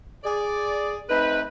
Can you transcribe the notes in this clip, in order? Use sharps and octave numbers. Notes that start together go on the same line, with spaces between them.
G#4 D5
A3 C4 D#4 B4